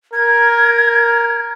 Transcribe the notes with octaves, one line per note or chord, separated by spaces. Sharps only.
A#4 G#6